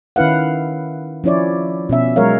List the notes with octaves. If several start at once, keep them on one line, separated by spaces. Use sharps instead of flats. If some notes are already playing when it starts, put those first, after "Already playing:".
D#3 C#4 E4 B4 F5 F#5
F3 C#4 E4 C#5 D5
B2 C#4 E5
F#3 G#3 A#4 C#5 F5